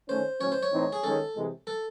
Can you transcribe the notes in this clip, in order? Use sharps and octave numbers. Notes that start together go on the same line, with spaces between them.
D#3 A3 C#4 C5
A2 F#3 C#4 C#5
C5
C#5
A2 E3 C4 D#4
G#4
D#3 G#3 C#4 A4
C3 E3 G#3
A4